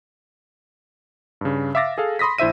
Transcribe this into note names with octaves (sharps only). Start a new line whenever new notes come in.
G2 C#3
E5 F5 D6 A6 A#6
G#4 A4 F5
B5 C6 D#6 A#6 B6
A#1 E4 C5 E5 D#7